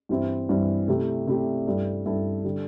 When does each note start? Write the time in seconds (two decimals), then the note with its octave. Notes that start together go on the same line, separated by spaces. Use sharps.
0.09 G2 E3 G3 C4 E4
0.49 G2 E3 G3 C4 E4
0.88 C3 A3 E4 G4
1.27 C3 A3 E4 G4
1.66 G2 G3 E4 A4
2.05 G2 G3 E4 A4
2.44 D3 G3